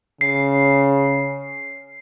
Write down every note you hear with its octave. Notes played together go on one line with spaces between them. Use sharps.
C#3 C7